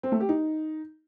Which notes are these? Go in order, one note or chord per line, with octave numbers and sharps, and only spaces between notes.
C4
A3
G4
D#4